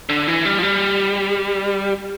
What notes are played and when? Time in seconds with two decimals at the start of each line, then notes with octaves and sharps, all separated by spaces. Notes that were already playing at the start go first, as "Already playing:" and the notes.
0.09 D3
0.28 E3
0.45 G3
0.58 F3
0.63 G3